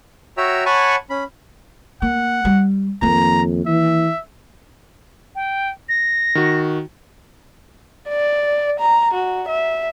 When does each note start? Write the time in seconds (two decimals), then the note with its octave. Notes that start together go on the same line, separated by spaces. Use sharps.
0.37 F#4 C#5 E5 G5 A#5 E6
0.66 C#5 F#5 G#5 A5 B5 C#6
1.10 C#4 B5
2.02 A#3 F#5
2.45 G3
3.02 F2 D#3 A#3 A#5
3.66 E3 E5
5.35 G5
5.89 A#6
6.35 D#3 F#4
8.09 D5
8.79 A#5
9.14 F#4
9.48 E5